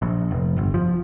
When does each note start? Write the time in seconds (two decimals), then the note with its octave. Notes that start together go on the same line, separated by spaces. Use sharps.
0.02 A#1
0.31 F1
0.58 G1
0.74 F3